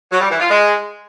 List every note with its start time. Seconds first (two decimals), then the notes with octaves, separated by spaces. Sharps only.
0.12 F#3
0.21 G3
0.31 E3
0.40 F4
0.50 G#3